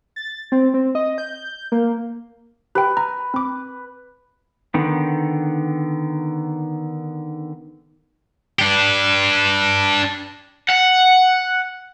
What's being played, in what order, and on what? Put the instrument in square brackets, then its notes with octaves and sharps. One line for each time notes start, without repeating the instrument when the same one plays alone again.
[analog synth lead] A6
C4
C4
D#5
G6
A#3
[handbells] G4 G5 [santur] B4
[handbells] A#5
C4 D6
[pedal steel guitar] D3 D#3 B3
[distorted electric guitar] D4 G4
[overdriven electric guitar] F#5